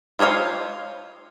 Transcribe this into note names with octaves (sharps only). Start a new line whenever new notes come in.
F4 C5 C#5 D#5 F5